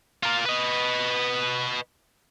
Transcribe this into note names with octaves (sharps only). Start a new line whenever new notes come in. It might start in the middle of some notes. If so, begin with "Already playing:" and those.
F4 A#4
B4 D#5